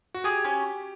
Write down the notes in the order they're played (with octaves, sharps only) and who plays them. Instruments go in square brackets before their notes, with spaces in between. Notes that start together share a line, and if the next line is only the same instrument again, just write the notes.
[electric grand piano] F#4
[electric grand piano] G4 [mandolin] G#4
[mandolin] C#4